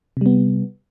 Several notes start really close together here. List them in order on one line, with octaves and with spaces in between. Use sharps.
C3 G3 B3